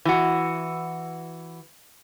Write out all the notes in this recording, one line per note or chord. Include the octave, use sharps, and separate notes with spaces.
E3 F#4